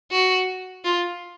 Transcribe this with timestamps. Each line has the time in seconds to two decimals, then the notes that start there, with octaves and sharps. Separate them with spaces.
0.12 F#4
0.85 F4